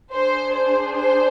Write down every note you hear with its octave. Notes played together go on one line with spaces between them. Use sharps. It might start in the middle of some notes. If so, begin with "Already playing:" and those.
D4 G#4 C5
C5
C5